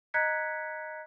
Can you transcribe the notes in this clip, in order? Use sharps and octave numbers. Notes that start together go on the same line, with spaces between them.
D#5 A#5 F#6 G#6 B6 C#7